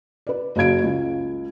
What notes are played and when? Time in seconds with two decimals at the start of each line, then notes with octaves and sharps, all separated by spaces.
0.27 B4 D5
0.56 F#1 F#4 F5 G#6 D7
0.83 C#2